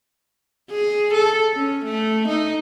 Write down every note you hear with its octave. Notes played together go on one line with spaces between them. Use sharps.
G#4
A4
C#4
A3
D#4